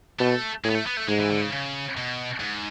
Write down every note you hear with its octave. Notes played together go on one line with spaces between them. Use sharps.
B2 A3
A2 G#3
B3
A3
B3
A3
G#2 G#3
E3
D3
C#3
C#3
B2
G#2